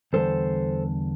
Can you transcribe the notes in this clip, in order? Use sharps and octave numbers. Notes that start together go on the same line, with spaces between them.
E2 D3 G3 A4 C5